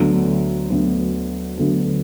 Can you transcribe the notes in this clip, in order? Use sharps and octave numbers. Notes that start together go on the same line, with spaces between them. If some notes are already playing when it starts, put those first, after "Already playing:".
Already playing: D2 D3 F#3 B3
D2 D3 F#3 B3
D2 D3 F#3 B3